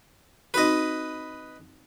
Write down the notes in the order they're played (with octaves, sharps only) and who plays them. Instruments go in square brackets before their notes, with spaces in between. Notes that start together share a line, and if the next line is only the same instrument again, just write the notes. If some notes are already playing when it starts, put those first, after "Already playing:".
[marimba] C4 D#4 F#4 [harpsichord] B4 D#5